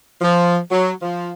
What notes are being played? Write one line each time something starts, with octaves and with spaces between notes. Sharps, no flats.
F3
F#3
F3